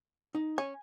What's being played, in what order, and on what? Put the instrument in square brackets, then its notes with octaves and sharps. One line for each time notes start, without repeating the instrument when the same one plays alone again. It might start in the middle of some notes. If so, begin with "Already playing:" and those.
[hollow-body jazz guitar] D#4
[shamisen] C#4 [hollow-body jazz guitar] G#5